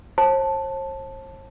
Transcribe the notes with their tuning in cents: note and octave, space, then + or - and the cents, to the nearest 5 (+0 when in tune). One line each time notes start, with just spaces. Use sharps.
C5 +45 A5 +0